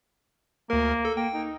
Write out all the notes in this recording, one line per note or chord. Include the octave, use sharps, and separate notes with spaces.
D2 A#3 A#4
A4
A#3 G5
D#4